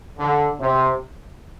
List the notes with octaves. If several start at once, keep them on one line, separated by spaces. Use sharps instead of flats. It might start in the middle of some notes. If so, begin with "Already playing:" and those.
D3
C3